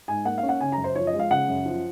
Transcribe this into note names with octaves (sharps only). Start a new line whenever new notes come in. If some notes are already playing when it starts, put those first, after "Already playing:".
G#2 G#5
A#3 F#5
F5
C#4
F#5
C#3 G#5
A#5
F#2
C5
F3 C#5
D#5
G#3
F5
C#3 F#5
F#2
F3